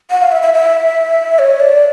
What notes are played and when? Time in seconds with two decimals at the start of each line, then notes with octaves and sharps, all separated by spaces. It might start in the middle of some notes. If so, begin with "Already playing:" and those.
0.11 F#5
0.22 F5
0.32 E5
0.42 E5
0.54 E5
1.39 C#5
1.60 D5